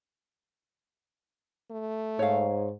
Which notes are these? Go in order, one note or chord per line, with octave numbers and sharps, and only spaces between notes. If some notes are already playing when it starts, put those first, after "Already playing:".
A3
G#2 C#5 F5